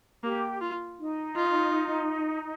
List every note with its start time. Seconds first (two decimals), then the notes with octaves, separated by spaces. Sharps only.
0.23 A#3 G4
0.61 F4
0.98 D#4
1.35 F4